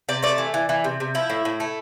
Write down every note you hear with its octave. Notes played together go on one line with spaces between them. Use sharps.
C3 D5
A3 D5
E3
E3
E3
C3
C3
F3 E4
A2
A2
A3